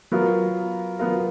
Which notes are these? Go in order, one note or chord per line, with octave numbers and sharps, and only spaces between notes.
F#3 B3 F4 A#4
F#3 B3 F4 A#4